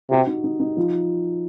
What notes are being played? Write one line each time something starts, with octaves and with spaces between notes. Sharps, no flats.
C3 F#4
D#4
D#4
D#4
F3